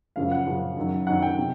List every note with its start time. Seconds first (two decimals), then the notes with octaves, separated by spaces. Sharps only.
0.16 F#2 C#3 F3 F5
0.31 F#5
0.47 F#2 C#3 F3
0.77 F#2 D#3 F#3
1.07 F#2 D#3 F#3 F#5
1.22 G5
1.38 C3